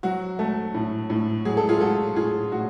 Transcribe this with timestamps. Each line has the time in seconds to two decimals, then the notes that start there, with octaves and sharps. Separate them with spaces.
0.03 F#3 F#4
0.39 A3
0.74 A2
1.10 A2
1.45 F#3 G#4
1.57 A4
1.69 F4 G#4
1.81 A3 F#4 A4
2.16 A2 F4 G#4
2.52 A2 F#4